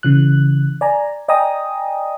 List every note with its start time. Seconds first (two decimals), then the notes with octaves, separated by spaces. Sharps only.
0.03 C#3 E3 F#6
0.81 D5 G#5 A#5
1.28 D5 D#5 G5 G#5 A#5 D#6